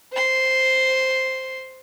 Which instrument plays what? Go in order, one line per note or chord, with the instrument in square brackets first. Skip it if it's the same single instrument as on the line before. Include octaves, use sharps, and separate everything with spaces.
[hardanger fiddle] C5 C6